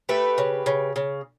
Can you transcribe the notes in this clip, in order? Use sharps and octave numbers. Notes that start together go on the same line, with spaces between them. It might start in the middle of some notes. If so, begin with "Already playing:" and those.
A3 G4 B4
C#3
C#3
C#3